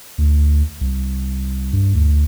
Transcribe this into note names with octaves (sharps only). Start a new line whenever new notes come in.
D2
C2
G2
D2